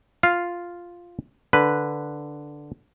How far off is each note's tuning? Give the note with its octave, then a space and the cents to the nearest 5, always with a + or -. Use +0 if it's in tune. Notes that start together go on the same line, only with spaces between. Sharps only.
F4 +0 F5 +0
D3 +0 B4 +0